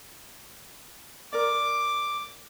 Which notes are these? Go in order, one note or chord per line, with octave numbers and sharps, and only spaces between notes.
A#4 D5 D6